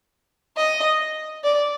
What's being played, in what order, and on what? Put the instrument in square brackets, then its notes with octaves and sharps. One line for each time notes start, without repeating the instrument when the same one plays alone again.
[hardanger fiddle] D#5
D5